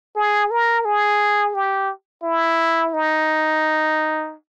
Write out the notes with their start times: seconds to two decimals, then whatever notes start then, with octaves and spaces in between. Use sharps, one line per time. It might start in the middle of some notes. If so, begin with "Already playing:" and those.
0.16 G#4
0.51 A#4
0.85 G#4
1.54 G4
2.23 E4
2.93 D#4